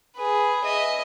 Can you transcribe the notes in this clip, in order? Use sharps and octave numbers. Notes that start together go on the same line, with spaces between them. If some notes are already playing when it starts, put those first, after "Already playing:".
G#4 B4
D#5 E5